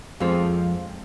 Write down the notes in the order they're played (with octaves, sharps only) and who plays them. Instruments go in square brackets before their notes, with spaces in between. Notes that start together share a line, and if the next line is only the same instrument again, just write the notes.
[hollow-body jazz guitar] F2 F3 [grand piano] G#3 C4 F4 A4